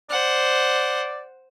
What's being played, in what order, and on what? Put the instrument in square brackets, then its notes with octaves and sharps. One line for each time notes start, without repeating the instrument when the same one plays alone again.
[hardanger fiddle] C5 F#5 [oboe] D5